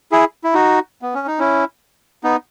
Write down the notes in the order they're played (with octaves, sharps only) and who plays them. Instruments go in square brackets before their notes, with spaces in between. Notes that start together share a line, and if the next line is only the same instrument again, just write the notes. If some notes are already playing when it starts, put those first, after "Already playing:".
[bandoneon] E4 G#4
E4
D#4 F#4
B3
C#4
D#4
C#4 E4
B3 D#4